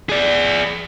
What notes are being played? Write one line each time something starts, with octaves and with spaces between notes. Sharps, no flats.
G#4 D5